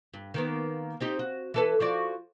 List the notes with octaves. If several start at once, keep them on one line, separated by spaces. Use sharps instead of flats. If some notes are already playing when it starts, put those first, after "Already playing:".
G2
D#3 A#3 B3
C4 D#4 G4
F#4
E3 A4 B4
F3 F#4 D5